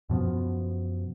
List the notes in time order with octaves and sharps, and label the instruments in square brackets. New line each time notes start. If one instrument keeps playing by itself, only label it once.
[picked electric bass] F#2 B2 F3 B3